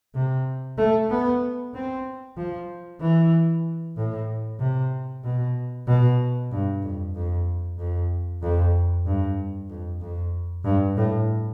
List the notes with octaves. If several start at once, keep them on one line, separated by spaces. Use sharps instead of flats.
C3
A3
B3
C4
F3
E3
A2
C3
B2
B2
G2
F2
F2
F2
F2
G2
F2
F2
G2
A2